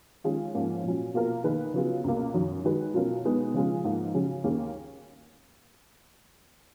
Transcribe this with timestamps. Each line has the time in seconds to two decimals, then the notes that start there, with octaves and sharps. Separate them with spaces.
0.24 D#3 G#3 C#4 F4 G#4
0.54 G#2 F3 A#3 C#4
0.84 A#2 F#3 C#4
1.14 B2 A#3 F4 A#4
1.44 D#3 A#3 D#4 G#4 B4
1.74 C#3 F#3 B3 F4 G#4
2.04 C#2 B2 A#3
2.34 F#2 D#3 F#3
2.64 D#3 G#3 D#4 F#4 B4
2.94 B2 F#3 C#4 F4 A#4
3.25 B2 G#3 B3 D#4 F#4
3.54 C#3 F3 G#3 C#4 F4
3.84 G#2 F3 A#3 D#4
4.14 C#3 F#3 C#4 G#4
4.44 D#2 D#3 A#3 C#4 G#4